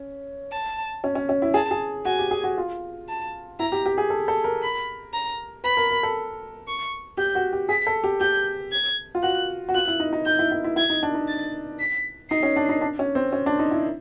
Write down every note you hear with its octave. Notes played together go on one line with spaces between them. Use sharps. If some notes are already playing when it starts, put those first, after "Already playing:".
Already playing: C#4
A5
C#4
C#4
C#4
E4
G#4 A5
G#4
F#4 G#5
G4
G#4
F#4
F4
A5
E4 A#5
G4
G4
G#4
A4
A4
A#4
B5
A#5
B4 B5
A#4
A#4
A4
C#6
G4 G6
F#4
G4
G#4 B6
A4
G4
G4 G6
G#6
F4
F#4 F#6
F#4
F4 F#6
E4
D#4
D#4
D#4 G6
E4
E4
E4
E4 G#6
D#4
D4
D#4
A6
B6
D#4 C7
C#4
D4
D#4
D4
C#4
C4
C#4
D4
D#4
E4